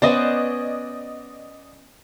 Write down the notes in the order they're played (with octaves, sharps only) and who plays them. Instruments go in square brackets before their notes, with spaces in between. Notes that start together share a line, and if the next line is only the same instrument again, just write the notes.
[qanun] B3 C#4 C5 [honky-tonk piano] D5 D#5